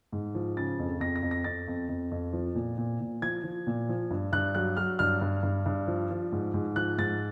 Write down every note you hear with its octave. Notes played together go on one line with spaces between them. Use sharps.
G#2
F3
C#3 A6
F2
F2 A#6
A#6
F2
A#6
F2 A6
F2
F2
F2
F3
A#2
A#2
A#2
F3 G#6
F3
A#2
F3
G2
G2 F#6
F#3 F#6
F#3 F6
G2 F6
G2
G2
G2
F3
F3
G#2
G#2
F3 F#6
G#2 A6